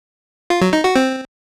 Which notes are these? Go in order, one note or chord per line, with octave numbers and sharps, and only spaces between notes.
F4
F#3
D#4
F#4
C4